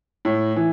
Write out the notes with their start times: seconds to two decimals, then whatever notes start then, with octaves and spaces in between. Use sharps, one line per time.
0.25 A2
0.56 E3